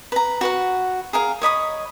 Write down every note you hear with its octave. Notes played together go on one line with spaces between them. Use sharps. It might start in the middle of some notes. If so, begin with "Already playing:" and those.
B4 A#5
F#4 B4 F#5
G#4 A#4 F5
C#5 D#5 B5 D#6